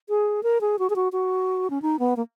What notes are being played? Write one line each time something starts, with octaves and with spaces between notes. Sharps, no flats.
G#4
A#4
G#4
F#4
G#4
F#4
F#4
C#4
D#4
B3
A#3